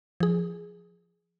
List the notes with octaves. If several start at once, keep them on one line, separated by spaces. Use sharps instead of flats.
F3 G#4